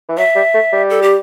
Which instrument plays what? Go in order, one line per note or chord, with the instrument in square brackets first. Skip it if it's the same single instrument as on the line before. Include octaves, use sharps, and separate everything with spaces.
[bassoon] E3
[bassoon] F#3 [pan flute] E5
[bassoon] G3
A3
G3
[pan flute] A4
G4